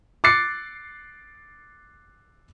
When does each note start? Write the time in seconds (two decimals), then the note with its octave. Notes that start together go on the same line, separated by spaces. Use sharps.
0.24 D6 F#6 A6 C7 C#7